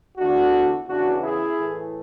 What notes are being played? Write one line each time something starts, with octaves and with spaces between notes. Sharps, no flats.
E2 D3 A3 D4 F#4
E2 C#3 E3 D4 F#4
E4 G#4
A2 E3 A3